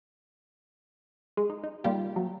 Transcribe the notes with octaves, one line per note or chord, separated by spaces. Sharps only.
G#3
D#4
D#4
G3 A#3 F4 G4
F#3